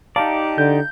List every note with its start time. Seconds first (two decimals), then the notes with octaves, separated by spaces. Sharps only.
0.16 D#4 G4 D5 F5 A5 A#5
0.58 D3 G6